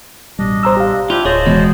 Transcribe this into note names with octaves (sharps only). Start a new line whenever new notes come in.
A1 B2 G3 D4 D#5
C5 A#5 E6
G4 F5
D4 E4 F4 G4
D1 G#4 C5 C#5 D#5 A5
E2 B2 G#3